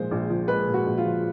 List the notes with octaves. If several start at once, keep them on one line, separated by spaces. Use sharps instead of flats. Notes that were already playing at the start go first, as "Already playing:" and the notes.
Already playing: A#2 F3 G#3 C5
A#1
F3
G#3 B4
A#2
F#4
A#1
F4
F3